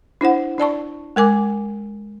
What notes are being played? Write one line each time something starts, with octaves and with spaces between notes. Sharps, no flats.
D4 E4 C5 F#5
D4 D5 A5 C#6
G#3 A#4 G#5 D6